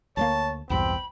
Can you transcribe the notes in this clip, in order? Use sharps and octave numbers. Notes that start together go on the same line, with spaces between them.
D2 G3 A#3 C#5 A5
B1 E2 G2 C4 G5 B5